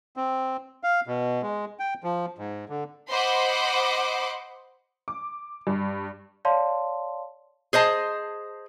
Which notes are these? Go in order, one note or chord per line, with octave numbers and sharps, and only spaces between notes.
C4
F5
B2
G#3
G5
F3
G#2
D3
C5 D#5 F#5 B5 C6 D6
D6
G2
C#5 D5 F5 A5 C6
G#4 C5 D#5 A5